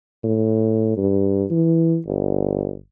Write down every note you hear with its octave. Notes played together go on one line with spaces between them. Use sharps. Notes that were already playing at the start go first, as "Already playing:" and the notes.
A2
G2
E3
G1